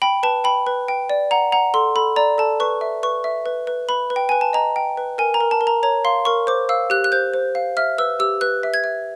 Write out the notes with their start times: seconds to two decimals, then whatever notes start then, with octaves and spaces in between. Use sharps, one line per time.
0.02 G5 B5
0.23 B4 A5
0.44 G5 B5
0.66 B4
0.88 G5
1.10 D5
1.31 F#5 A#5
1.52 F#5 A#5
1.74 A4 C6
1.96 A4 B5
2.16 D5 A#5
2.38 A4 A5
2.60 B4 C#6
2.81 E5
3.03 B4 C#6
3.24 E5
3.46 B4
3.67 B4
3.89 B4 B5
4.10 B4
4.16 G5
4.29 B4 G#5
4.41 A5
4.53 D#5 A#5
4.76 G5
4.97 B4
5.18 A#4 G#5
5.34 A#5
5.40 A#4
5.51 A5
5.61 A#4
5.67 A#5
5.83 C#5 A#5
6.05 F5 C6
6.25 A#4 C#6
6.47 C5 D6
6.69 F5 E6
6.90 G4 F#6
7.04 F#6
7.12 C5 G6
7.34 C5
7.55 F5
7.77 E5 F6
7.98 B4 E6
8.20 G4 E6
8.41 B4 F#6
8.63 E5
8.74 G#6
8.84 E5